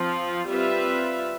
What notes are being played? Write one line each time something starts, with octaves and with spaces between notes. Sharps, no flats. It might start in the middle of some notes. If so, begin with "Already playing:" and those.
Already playing: F3 C4 F4
G3 C4 F4 B4 E5